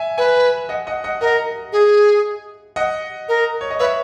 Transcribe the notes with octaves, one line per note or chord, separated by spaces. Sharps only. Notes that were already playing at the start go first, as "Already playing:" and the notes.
Already playing: E5 G#5
B4 E5 G#5
D#5 F#5
D#5 F#5
D#5 F#5
A#4 D#5 F#5
G#4
D#5 F#5
A#4
C#5
D#5
B4 C#5 E5